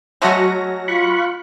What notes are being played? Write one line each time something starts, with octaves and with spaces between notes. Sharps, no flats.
F#3 G#3 A3 C#4 F#4 A#6
F4 B5 C#6 F#6